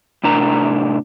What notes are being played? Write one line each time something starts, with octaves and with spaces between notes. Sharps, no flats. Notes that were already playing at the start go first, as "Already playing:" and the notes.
A2 C3 D4 A#4 A#5